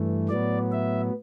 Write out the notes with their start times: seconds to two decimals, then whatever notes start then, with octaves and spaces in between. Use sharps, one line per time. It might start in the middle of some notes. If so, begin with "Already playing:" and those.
Already playing: G2 E3 A3
0.29 A2 F#3 B3 D5
0.72 E5